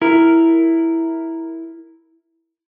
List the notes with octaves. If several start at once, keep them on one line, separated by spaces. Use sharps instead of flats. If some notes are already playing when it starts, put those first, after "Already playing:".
E4 A#4